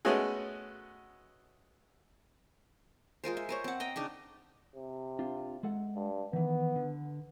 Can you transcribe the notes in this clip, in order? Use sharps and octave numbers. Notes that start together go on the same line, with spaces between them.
G#3 A3 B3 C#4 F#4 G#4
G#3 F4 A#4 C5
E5
A#4 C5 C#5
C4 F#5
D#5 G5 A#5
C#3 D4 D#4
C3
C4 D4 F4
G#3 A4 F#5
G2
D#3 E3 B3
D3